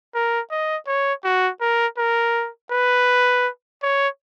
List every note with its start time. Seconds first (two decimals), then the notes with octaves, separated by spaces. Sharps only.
0.15 A#4
0.51 D#5
0.87 C#5
1.24 F#4
1.61 A#4
1.98 A#4
2.71 B4
3.82 C#5